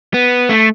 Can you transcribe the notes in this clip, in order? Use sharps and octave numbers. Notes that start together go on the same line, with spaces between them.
B3
A3